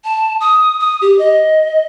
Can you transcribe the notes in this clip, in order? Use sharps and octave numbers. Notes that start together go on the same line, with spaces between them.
A5
D#6
D#6
G4
D#5